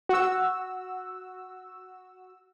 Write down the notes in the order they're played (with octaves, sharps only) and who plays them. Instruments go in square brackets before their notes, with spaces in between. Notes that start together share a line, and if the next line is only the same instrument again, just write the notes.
[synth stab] F#4 E6